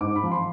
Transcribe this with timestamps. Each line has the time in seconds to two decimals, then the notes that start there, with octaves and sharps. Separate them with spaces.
0.01 G#2 D6
0.16 B5
0.24 F3
0.32 C6